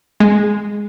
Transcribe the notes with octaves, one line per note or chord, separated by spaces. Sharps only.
G#3